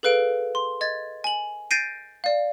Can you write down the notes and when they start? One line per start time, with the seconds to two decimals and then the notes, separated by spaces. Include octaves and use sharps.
0.03 G#4 A4 B4 F5 D7
0.55 C6
0.81 D#5 G#6 A6
1.24 G#5 F#7
1.71 G6 A6 A#6 C7 D7 D#7
2.24 D5 F5